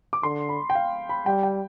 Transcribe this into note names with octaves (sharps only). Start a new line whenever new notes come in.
D6
D3 C6
B5
G5
F5
B5
G3 G5
G5